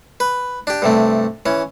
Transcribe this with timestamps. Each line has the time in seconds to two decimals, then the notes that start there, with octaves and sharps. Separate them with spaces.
0.20 B4
0.67 D4 G4
0.82 G2 C3 A3
1.46 E3 C#4